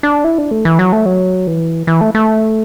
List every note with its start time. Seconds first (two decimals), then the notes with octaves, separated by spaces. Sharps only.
0.03 D4
0.24 E4
0.38 D4
0.51 A3
0.65 E3
0.79 F#3
0.93 A3
1.06 F#3
1.47 E3
1.87 E3
2.01 A3
2.15 A3